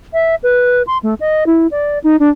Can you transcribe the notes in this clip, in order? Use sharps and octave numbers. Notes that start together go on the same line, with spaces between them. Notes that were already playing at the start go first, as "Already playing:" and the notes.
E5
B4
C6
A3
D#5
E4
D5
D#4
D4